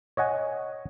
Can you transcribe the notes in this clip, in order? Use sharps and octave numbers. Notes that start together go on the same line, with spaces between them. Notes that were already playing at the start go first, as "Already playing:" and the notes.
C#5 D#5 F#5 G#5